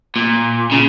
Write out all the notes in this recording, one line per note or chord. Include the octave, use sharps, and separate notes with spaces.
A#2
C#3